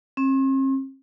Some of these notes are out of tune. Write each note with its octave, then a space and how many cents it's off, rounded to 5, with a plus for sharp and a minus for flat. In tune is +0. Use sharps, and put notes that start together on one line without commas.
C4 +45